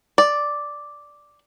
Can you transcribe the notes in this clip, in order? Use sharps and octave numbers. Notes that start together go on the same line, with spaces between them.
D5